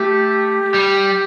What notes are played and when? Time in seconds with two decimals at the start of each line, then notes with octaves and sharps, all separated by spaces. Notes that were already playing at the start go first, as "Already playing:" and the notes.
Already playing: A3 G4
0.74 G3